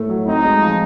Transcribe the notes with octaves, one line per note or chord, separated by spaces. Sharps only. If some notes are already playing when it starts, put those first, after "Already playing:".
Already playing: A2 A3
F#3
C4 D#4
G#3
F3